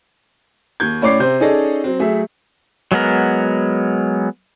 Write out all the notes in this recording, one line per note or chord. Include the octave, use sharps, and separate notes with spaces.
D#2 G6 G#6
A2 C#4 C#5 D5 D6 C7
C3 C4 C5 G6
C#4 D#4 G#4 A4 D5 D#5
F#3 C4
F#3 A3 G#4 E5
F#3 G#3 B3 A#4